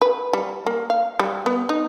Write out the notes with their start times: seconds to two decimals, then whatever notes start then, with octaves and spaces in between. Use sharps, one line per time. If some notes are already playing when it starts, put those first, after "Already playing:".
0.02 B4
0.33 G3
0.66 A#3
0.90 F5
1.19 G3
1.46 B3
1.69 D#4